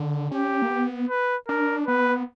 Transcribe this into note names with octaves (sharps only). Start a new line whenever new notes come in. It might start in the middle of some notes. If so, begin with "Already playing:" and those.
Already playing: D3
C#4 G4
A#3
B3
B4
D4 A#4
B3 B4